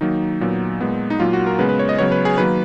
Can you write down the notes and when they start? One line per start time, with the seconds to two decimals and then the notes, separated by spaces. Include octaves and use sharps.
0.01 D#3 F#3 A#3 D#4
0.41 A#2 F#3 B3
0.81 A#2 G#3 B3
1.10 D#4
1.20 A#2 F#3 A#3 F4
1.33 F#4
1.46 A#4
1.59 C#3 G#3 B3 B4
1.69 B4
1.79 C#5
1.89 D#5
1.98 C#3 F#3 B3 C#5
2.12 B4
2.25 G#4
2.38 D#3 F#3 A#3 B4